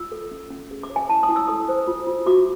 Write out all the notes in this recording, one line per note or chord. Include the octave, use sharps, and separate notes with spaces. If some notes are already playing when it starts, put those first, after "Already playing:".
Already playing: F4 E6
A4
C#4
C#4
G#4
D6
C#5
G#5
E4 A5
D#6
E4
E6
A4 D#6
C5
F4
F4
F#4 D6